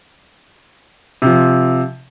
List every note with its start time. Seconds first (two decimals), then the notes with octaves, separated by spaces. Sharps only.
1.22 C3 F3